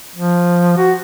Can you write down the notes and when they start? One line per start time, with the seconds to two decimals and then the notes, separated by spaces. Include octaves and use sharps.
0.16 F3
0.77 F#4